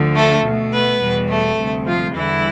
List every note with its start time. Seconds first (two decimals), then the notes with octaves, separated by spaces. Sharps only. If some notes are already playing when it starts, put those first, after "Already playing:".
Already playing: D2 D3 F3
0.15 A3 A4
0.44 B2 A3
0.72 B3 B4
1.00 E2 B2 G3
1.29 A3 A4
1.58 D2 C3 G3
1.86 F3 F4
2.14 E2 D3 E3 G3 E4